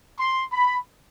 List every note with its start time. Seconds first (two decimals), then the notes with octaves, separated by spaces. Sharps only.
0.18 C6
0.53 B5